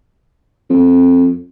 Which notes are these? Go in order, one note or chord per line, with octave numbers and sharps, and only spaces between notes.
F2